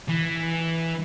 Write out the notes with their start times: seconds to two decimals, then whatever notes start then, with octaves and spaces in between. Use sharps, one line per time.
0.08 E3